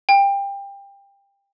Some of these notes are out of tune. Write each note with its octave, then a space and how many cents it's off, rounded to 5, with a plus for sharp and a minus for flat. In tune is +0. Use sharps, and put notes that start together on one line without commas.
G5 +25